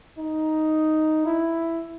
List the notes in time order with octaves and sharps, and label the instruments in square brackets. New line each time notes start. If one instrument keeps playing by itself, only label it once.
[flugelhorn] D#4
E4